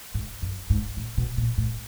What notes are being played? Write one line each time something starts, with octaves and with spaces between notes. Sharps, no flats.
G#2
F#2
G#2
A2
B2
A#2
A2